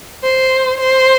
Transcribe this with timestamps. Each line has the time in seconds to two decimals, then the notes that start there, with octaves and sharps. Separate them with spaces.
0.23 C5
0.80 C5